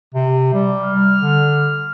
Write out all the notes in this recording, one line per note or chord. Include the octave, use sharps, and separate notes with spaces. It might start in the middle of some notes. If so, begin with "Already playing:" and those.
C3
G3
F6
D3